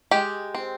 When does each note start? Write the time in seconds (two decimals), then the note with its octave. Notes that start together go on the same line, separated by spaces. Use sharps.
0.11 G#3 G4
0.55 C4